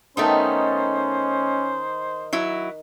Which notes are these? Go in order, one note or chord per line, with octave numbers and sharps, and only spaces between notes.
D#3 A3 B3 C#4 D#4 C5 D#5
F#3 E4